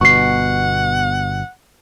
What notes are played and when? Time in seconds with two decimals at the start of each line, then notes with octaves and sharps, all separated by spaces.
0.01 G1 B2 F#5 C#6 C7